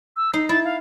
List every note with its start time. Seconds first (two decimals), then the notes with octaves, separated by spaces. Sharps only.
0.17 E6
0.33 D#4 C7
0.49 E4 A6
0.65 F5